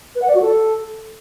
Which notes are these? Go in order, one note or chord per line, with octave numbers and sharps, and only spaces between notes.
B4
F#5
D5
F#4
A4